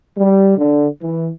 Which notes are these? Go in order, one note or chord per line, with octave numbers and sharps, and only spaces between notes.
G3
D3
E3